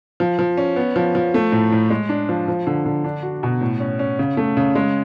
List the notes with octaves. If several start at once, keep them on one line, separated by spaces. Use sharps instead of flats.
F3
F3
C#4
B3
F3
F3
A3
A2
A2
G#3
D4
F3
F3
D3
D3
D4
F#4
B2
A2
C#4
C#4
C#3
A3
C#3
G#3